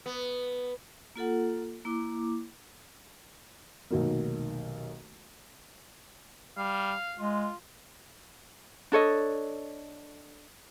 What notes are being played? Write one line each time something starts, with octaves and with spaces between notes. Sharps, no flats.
B3
A#3 F4 A4 F#5
A#3 E4 D6
F1 B1 D#3 F#3 A#3
G3 F5
G#3 F4
D4 A4 C#5 D#5